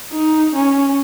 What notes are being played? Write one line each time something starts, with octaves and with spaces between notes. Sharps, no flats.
D#4
C#4